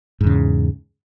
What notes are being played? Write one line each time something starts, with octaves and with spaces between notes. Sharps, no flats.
E2 G#2 C#3